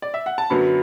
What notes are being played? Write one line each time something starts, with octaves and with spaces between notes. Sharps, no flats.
D5
E5
F#5
A5
F#2 D3 F#3 B3 B5